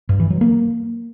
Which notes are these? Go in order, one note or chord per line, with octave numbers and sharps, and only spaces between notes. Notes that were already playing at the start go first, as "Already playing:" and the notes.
G2
E3
F#3
A#3